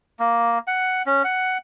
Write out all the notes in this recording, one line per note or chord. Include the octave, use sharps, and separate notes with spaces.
A#3
F#5
C#4
F#5